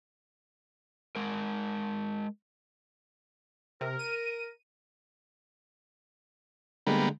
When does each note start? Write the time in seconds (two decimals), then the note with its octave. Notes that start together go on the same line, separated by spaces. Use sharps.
1.16 G#3 A#4
3.81 C3 A#4
3.99 D#7
6.87 D3 G3 G#3 A#3 B3